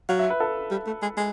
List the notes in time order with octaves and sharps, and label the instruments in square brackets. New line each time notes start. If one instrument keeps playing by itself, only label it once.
[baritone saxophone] F#3 [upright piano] F5
[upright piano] E5
B4
A4
[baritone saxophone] G3
A3
G#3
G#3